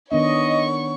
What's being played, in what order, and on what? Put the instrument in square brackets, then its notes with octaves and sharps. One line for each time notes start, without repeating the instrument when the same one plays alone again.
[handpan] D#3 B3 D4 [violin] C#5 C#6 [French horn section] D#5